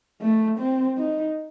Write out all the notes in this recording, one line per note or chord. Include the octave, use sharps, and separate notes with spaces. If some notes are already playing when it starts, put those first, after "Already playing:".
A3
C4
D#4